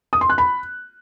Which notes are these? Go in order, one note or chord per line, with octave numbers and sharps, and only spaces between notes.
D#6
C6
F#6
B5